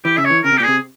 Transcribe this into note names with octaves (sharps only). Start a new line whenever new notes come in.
E3 G4
C#3 E5
C#5
E3
C#3 A#4
C3
G4
A#2
C3 G#4